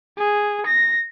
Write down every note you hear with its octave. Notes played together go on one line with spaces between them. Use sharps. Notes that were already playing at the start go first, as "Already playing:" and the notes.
G#4
A#6